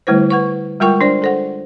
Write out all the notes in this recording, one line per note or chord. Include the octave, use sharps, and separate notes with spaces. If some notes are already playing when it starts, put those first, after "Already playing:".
D3 G3 A3 E4 B4 C5
B4 F#5 C#6
G3 G#3 F4 A#4 G5 C#6
D4 C5 D5
A4 C5 F#5